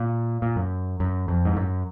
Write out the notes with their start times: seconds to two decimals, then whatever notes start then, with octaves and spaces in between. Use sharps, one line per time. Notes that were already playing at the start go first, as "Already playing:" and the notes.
Already playing: A#2
0.42 A#2
0.56 F#2
1.00 F#2
1.28 F2
1.45 G#2
1.57 F#2